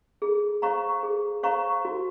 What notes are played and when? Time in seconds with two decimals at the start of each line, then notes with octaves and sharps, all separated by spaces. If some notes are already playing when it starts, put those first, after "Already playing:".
0.22 G#4
0.62 C5 F5 A#5 C#6
1.03 G#4
1.43 C5 F5 A#5 C#6
1.85 F#4